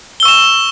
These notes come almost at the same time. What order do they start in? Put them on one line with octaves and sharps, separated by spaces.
G7 E6 C#6 E7